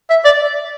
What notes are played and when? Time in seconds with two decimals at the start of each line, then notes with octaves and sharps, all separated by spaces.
0.10 E5
0.25 D5